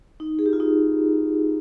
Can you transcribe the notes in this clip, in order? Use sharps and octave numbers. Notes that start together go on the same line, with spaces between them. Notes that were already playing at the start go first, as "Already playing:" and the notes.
D#4
G#4
G4
F4
D#4